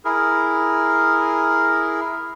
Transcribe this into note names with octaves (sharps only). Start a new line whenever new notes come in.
E4 G#4 A#4